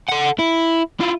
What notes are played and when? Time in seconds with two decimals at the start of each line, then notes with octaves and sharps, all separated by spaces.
0.08 A4 F#5
0.39 E4
1.00 E4 F4